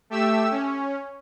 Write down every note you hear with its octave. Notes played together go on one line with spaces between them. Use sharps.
A3 G4 E5 E6
C#4